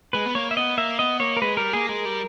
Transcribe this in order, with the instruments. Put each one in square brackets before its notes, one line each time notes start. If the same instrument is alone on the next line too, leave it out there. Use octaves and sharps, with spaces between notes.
[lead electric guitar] G#3 [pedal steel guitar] B4
[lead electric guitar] B3
[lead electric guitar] A#3 [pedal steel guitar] C#5
[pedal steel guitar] E5
[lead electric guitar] B3 [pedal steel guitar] D#5
[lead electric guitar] A#3 [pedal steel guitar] E5
[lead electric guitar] B3 [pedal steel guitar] D#5
[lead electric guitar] A#3 [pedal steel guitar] C#5
[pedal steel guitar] A#4
[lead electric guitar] G#3 [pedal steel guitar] B4
[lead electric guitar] G3 [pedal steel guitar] A#4
[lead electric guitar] A#3 [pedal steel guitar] G#4
[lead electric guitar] G#3 [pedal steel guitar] A#4
[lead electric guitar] G3